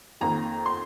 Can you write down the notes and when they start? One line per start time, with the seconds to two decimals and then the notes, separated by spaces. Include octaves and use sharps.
0.21 F2 D#3 A#3 A#5
0.66 C6